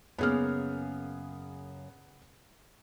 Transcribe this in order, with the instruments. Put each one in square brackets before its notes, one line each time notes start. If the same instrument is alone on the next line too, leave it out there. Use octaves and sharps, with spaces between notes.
[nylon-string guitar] F#2 C#3 A#3 [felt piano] B3 G#4 F6